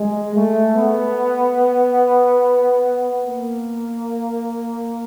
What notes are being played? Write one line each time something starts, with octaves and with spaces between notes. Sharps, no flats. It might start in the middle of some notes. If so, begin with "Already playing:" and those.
Already playing: G#3
A3
B3
A#3